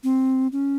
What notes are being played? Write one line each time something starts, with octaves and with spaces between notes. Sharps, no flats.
C4
C#4